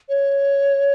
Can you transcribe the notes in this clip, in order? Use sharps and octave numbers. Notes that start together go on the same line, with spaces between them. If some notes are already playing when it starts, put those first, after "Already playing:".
C#5